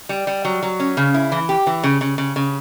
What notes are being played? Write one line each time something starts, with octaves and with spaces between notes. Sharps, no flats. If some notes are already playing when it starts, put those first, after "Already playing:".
G3
G3
F#3
F#3
C#4
C#3
E4
E3
G4
E3
C#3
C#3
C#3
C#3